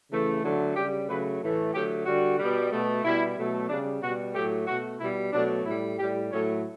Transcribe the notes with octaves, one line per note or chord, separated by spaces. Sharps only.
C#3 E3 A3
D3 F#3 A3
C#3 G3 G4
C#3 F#3 A3 B4
A2 E3 A3
D3 F#3 A3 G4
D3 G3 F#4
B2 G3
B2 A3
B2 G3 E4
B2 F#3 A3
C#3 G3 D4
B2 G3 F#4
A2 F#3 A3 G4
B2 A3 F#4
B2 G3 E4
B2 F#3 A3 D4
A2 G3 E4
A2 G3 G4
A2 F#3 A3 C#4